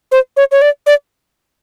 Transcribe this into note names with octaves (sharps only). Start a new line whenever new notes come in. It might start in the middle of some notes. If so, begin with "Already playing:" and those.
C5
C#5
C#5
D5
D5